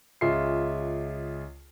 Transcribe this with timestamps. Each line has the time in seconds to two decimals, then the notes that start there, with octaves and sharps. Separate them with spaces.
0.21 C#2 F4 G#4 E5 C6 C7